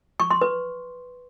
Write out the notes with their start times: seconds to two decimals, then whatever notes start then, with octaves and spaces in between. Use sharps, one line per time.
0.20 C#6
0.31 C6
0.41 B4